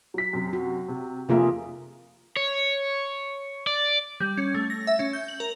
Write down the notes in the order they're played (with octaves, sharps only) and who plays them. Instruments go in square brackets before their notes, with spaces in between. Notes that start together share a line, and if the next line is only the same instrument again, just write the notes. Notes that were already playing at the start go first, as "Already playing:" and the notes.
[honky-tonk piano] F#3 B6
F#2 C3
[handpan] F#4
[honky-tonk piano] C3
[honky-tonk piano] F1 A#3 E5 [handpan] C3 F4 G#4
[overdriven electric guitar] C#5
D5
[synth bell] G3
C#4
A3
A#6
E5
C#4
G6
F#7
A#4